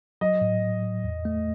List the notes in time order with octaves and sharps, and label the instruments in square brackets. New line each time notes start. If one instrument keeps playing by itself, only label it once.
[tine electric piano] F#3 [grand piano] D#5
[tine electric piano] A2
F#3
A2
E2
A3